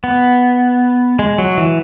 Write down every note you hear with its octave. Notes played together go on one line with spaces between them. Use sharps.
B3
G#3
F#3
E3